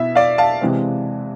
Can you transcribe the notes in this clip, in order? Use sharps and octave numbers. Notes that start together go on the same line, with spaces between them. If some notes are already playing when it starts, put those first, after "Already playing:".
Already playing: B2 B3 E4 E5
D5 F5
F5 A5
C3 E3 G#3 C4